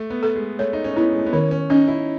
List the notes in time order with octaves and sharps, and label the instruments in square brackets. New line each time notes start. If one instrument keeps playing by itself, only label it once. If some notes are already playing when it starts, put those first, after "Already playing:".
Already playing: [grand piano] A3
B3
[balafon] A4
[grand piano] G#3
[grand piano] A3 [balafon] C#5
[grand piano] D#4
C#4
[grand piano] B3 [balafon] E4
[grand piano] G#3
A3
B3
[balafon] D#3 [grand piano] C#4
[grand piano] C#4
[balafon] C#4 [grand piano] D#4
[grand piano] E4